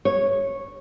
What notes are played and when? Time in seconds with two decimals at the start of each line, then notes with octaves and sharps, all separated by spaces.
0.05 C#5